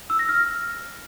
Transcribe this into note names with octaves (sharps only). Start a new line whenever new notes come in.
E6
A#6
F6